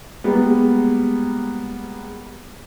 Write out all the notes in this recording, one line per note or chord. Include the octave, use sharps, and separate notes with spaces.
G3 G#3 A#3 B3